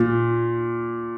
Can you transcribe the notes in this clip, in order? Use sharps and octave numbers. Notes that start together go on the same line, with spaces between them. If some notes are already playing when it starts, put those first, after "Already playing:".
Already playing: A#2